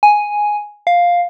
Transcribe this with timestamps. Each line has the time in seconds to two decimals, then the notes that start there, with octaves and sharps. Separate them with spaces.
0.03 G#5
0.87 F5